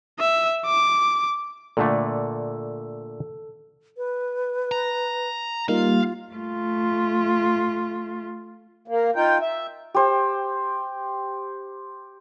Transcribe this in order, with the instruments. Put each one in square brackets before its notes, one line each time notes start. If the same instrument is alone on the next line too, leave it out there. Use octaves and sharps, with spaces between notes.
[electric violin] E5
D6
[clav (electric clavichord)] A#2 D3 A3 [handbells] A4
[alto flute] B4
[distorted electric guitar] A#5
[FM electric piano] G3 A#3 D#4 [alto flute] F4 [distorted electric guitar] F5
[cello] A3 F4
[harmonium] A#3
D#4 F4 G5
E5
[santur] G4 C5